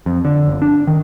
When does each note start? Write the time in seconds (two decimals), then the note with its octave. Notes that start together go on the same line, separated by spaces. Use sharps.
0.06 F2
0.25 D3
0.48 G1
0.62 D4
0.87 D#3